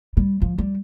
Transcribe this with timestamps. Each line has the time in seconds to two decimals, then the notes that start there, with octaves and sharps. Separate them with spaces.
0.17 G3
0.42 F3
0.58 G3